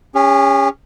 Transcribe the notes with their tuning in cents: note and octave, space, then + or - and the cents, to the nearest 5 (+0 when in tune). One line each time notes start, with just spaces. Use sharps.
C#4 +5 G#4 -45